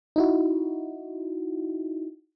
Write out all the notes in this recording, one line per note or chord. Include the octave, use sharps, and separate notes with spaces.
D#4 E4 F#4